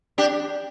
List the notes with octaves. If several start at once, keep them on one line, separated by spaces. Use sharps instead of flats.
D4 G4